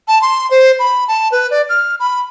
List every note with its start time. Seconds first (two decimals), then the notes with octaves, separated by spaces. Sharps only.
0.08 A5
0.22 C6
0.51 C5
0.79 B5
1.08 A5
1.32 B4
1.51 D5
1.69 F6
2.00 B5